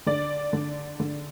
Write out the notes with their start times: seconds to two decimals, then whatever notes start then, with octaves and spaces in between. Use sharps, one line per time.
0.06 D3 D5
0.53 D3
1.00 D3